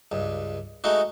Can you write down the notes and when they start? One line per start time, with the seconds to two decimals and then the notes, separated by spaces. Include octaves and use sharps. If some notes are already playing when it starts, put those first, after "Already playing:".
0.12 C#2 G2
0.84 G#3 A3 D#4 F#4